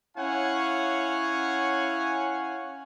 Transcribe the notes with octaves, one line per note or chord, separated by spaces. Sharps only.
C#4 E4 C#5 F5 F#5 G#5